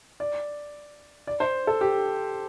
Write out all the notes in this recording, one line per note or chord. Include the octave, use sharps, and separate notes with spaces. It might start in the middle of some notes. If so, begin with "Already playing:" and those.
D5
D5
C5
A4
G4